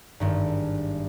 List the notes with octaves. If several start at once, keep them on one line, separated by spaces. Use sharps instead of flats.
G#1 G2